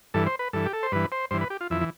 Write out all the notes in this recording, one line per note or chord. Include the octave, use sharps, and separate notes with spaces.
G2 E3 A4
C5
B4
G2 E3 A4
G4
A4
C5
G2 E3 B4
C5
G2 E3 C5
B4
G4
F4
F2 E3 E4
E3